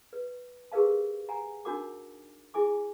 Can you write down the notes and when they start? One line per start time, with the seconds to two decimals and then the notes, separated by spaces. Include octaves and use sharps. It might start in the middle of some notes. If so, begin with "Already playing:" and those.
0.13 B4
0.72 G4 G#4 A#4 B4 F5 A5
1.29 F#5 G#5 A#5
1.65 D4 D#4 F#4 A#4 F#5 D6
2.54 E4 G#4 G#5 D6